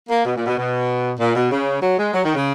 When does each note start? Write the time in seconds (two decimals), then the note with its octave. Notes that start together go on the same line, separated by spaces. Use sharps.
0.09 A#3
0.25 B2
0.36 A#2
0.46 B2
0.57 B2
1.19 A#2
1.35 B2
1.50 C#3
1.82 F#3
1.98 G#3
2.14 F#3
2.24 D#3
2.34 C#3